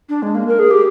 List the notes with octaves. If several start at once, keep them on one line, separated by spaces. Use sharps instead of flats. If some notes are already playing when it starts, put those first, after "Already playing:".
D4
G#3
A#3
A#4
G#4
G4